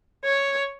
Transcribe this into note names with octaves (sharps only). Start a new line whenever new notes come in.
C#5